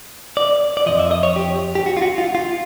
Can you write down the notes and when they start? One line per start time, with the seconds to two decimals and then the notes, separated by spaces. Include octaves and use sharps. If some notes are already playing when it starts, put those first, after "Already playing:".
0.37 D5
0.77 D5
0.86 F2 C3 F3 D#5
0.99 E5
1.11 D#5
1.23 C#5
1.36 G4
1.75 G4
1.86 F#4
1.97 F4
2.02 F#4
2.18 F4
2.35 F4